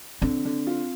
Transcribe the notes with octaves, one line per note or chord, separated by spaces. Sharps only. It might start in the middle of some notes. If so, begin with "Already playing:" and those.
D3 C4
D3
F4